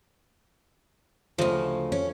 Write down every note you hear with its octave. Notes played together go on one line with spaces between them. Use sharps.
D2 C#3 F3 A3 D#5
C#4